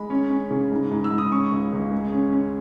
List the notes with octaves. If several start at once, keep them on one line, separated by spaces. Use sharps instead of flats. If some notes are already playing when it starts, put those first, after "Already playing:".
Already playing: G#3 B5
C#4
C#4
C#3
G#2
G#2
E6
G#2
D#6
C#4 C#6
C#2
C#2
G#3
C#4
C#4